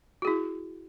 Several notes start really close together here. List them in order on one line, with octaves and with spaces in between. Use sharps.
F#4 G#4 E4